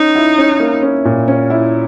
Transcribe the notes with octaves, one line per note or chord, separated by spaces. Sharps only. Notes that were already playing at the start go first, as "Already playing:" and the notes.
Already playing: C#4 D#4
E4
C#4
A#3
C#4
A#2
C#4
E4